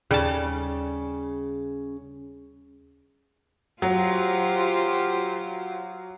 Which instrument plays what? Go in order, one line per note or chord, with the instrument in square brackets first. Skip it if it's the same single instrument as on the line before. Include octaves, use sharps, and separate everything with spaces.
[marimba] D#2 [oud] C#3 [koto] G3 A5
[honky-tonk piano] F#3 [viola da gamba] F4 G4 C5